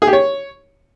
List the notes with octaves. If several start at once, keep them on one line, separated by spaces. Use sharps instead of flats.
G#4
G4
C#5